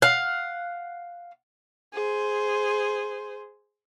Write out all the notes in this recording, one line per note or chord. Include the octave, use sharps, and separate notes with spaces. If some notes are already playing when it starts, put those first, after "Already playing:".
F5 F#5
G#4 C5